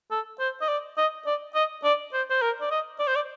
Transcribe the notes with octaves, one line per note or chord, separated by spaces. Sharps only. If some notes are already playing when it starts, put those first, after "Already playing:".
A4
C5
D#5
D5
D#5
D5
D#5
D5
C5
C5
A#4
D5
D#5
D5
C5
D5